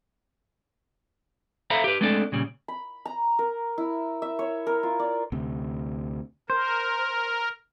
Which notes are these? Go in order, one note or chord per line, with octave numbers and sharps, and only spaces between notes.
A4 C5 E5 F5 A#5 B5
G4 B4
G#3 A3 C4 D4 A4
A#2 C#3 G3
B5
A#5
A#4
E4
E5
C#5
A#4
F4
D5
D2 C3
A#4 C5